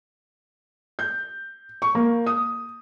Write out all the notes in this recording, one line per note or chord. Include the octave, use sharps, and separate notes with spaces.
G6
C#6
A#3
D#6